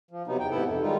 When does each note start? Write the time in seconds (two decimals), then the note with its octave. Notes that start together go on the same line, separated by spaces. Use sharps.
0.11 F3
0.27 C3 F#3 B3 D#4
0.39 E2 G5
0.51 G#2 C3 B3 E4 A4 F#5
0.66 F2
0.82 D#3 G3 G#3 D#4 F4